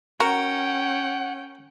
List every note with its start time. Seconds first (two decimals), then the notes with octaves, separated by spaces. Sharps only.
0.20 C#4 F#4 A#4 F#5 G5